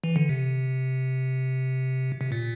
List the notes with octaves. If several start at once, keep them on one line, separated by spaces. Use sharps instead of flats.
E3
D3
C3
C3
A#2